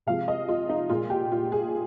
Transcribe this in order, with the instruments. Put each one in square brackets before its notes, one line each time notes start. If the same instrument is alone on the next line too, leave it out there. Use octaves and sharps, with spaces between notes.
[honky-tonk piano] C3 F3 G#3 F5
D#5
F4
D#4
A#2 G#3 F4
G4
F4
G#4